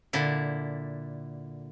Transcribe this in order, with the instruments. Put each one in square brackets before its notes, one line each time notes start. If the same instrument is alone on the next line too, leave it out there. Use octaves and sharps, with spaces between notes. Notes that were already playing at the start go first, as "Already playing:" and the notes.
[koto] A#2 D3 E4